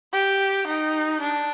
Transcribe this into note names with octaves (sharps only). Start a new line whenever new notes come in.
G4
D#4
D4